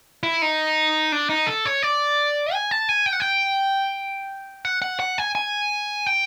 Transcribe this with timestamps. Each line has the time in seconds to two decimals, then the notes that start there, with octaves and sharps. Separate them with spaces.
0.23 E4
0.42 D#4
1.12 D4
1.30 D#4
1.47 A4
1.65 C#5
1.82 D5
2.53 G#5
2.71 A5
2.89 G#5
3.06 G5
3.13 F#5
3.20 G5
4.65 F#5
4.82 F#5
5.00 F#5
5.18 G#5
5.35 G#5
6.06 G5